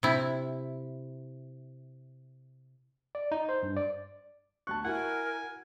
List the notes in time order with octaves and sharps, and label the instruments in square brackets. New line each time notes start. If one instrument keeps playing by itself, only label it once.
[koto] C3 E4
[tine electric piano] D5
D#4
C5
G2
D5
[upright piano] D2 F#6 [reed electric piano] A5 C#6
[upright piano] E4 F#4 [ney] A#4 [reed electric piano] F#5 [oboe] G#5